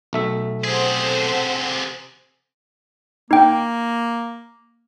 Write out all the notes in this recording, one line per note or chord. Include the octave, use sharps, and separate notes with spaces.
B1 A3 E5
C3 G#4 A4 C5 F#5
A#3 D#4 G5